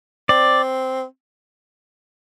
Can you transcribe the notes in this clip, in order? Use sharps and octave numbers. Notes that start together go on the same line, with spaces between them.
C4 D5